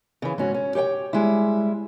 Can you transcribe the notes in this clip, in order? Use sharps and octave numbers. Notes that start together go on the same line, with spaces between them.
C#3 E3
G#2 C#4 F#4
C#4
G4 C#5 F#5 G5
G3 G#3 E4